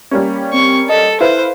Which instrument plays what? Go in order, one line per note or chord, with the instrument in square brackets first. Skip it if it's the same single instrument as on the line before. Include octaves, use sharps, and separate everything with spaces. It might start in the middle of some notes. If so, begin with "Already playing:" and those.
[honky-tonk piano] G3 A#3 C#4
[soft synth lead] C4 [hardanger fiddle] C#6
[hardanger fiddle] A4 [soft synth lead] D#5
[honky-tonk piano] E4 B4 [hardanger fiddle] C5 [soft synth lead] F5